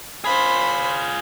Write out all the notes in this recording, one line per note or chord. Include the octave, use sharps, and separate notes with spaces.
F4 G#4 C5 B5